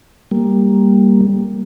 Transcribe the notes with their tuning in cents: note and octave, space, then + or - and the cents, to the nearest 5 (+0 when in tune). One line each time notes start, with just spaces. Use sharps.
G3 +10 A#3 +0